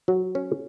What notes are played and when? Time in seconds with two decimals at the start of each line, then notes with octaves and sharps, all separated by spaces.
0.08 F#3
0.35 C#4